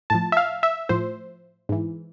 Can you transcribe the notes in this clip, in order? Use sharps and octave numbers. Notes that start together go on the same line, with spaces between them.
A2 F3 A5
E5
F5
E5
A2 F3 C5
G#2 E3